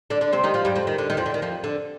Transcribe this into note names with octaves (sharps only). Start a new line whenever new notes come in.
D3 D4
D3 D4
C3 C4
D#3 D#4
F3 F4
G2 G3
F2 F3
D#3
D3
D#3
F2 F3
D3
D#3
F2 F3
D3